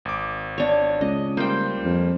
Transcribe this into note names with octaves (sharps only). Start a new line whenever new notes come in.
G#1 D6
D4 C#5
C#2 D#5
G3 A#3 C5 G5
F2